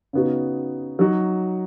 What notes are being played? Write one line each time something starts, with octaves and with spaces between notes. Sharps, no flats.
C#3 B3 D#4 F#4
F#3 D#4 F#4